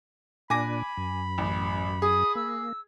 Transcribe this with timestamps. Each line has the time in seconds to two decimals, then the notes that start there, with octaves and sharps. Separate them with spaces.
0.50 A#2 D4 G#5 B5 D6 A#6
0.97 F#2
1.38 A1
2.02 G#4 D#6
2.35 A#3 E6